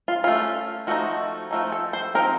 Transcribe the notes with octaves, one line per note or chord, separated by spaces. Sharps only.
F4
A3 C#4 F4
F3 A3 D#4 F#4
F3 A3 D#4
A4
C5
F3 C4 D#4 A#4